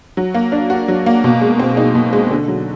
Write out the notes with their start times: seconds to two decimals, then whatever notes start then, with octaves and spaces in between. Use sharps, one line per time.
0.17 F#3
0.34 A#3
0.52 D4
0.70 F#4
0.88 F#3
1.06 A#3
1.24 B2
1.41 G#3
1.59 C4
1.77 D#4
1.95 B2
2.13 G#3
2.31 D3
2.48 F#3